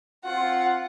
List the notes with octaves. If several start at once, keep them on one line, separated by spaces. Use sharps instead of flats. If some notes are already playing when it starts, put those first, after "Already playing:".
C4 F4 F#5